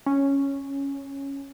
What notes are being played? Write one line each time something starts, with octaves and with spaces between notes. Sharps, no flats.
C#4